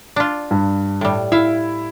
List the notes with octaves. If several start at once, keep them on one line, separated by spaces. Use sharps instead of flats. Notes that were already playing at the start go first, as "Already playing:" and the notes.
D4 F4
G2
A2 G3
E4 E5 F5